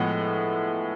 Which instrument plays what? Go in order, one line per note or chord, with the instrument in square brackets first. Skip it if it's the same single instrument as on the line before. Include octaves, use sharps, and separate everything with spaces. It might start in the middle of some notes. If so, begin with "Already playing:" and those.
Already playing: [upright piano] A2 F3 G#3 B3 E5 F#5